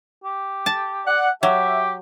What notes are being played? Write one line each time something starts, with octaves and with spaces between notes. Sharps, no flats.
G4
A5
D5 F#5
F#3 G4 E5